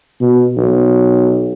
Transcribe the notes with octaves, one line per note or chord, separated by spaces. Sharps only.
B2
B1